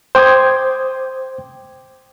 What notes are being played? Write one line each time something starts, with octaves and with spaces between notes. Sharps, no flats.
C5 G5 D6 D#6 G#6